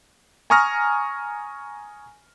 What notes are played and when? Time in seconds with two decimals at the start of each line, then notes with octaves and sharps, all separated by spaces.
0.50 G#5 A#5 C#6 D#6 F6 A#6